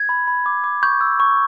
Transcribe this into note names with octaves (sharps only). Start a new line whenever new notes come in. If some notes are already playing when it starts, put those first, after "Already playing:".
Already playing: G#6
B5
B5
D6
D6
C#6 G6
E6
C#6